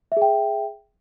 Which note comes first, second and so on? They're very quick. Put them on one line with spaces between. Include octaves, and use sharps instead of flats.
E5 G#4 G5